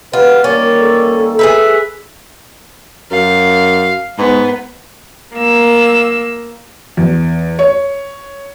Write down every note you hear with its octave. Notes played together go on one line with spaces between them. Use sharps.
F4 G4 B4 F#5
D#3 G3 A#3 C#4 A#4 D5
A4
G#4 A#4 B4 E5
F#2 F5
G#2 B3
A#3 E6
E2
C#5